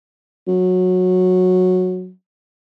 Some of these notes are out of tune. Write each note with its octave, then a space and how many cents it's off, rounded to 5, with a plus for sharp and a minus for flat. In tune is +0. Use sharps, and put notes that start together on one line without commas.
F#3 -15